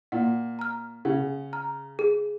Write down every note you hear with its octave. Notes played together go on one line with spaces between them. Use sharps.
A#2 F#5
A#5 F6
C#3 F#5
A#5 F6
G#4